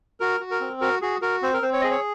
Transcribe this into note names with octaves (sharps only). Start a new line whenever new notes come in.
F#4 A#4
F#4
A#4
C4
F#4 A#4
F#4 G#4
F#4 A#4
C4 C5
A#4
C4 C5
C#5
G#4 D#5
C#5